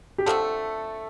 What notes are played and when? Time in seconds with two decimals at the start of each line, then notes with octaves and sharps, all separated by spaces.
0.18 G4
0.26 D3 F3 A3 C4 A4